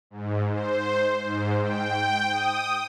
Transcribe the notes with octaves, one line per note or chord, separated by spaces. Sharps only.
G#2
C5
G#2
G5
D#6